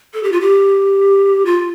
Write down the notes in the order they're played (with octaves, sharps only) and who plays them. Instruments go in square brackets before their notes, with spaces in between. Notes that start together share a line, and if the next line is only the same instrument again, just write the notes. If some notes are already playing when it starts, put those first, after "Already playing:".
[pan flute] A4
G4
F4
G4
F4